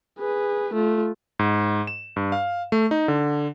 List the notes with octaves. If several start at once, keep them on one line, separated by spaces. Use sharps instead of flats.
G#4 B4
A3 F4
G#2
E7
G2
F5
A3
D#4
D3